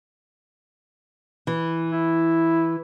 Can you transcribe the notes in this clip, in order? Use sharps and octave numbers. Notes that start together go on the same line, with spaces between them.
E3
E4